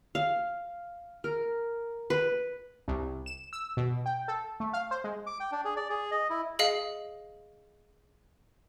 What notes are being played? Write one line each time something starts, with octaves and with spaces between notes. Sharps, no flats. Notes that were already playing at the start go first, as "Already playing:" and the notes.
F5
A#4
B4
C2
E7
E6
B2
G5
A4
A3
F5
C5
G#3
D6
G5
D4
G#4
D5
G#4
D#5
E4
G#4 D#5 F5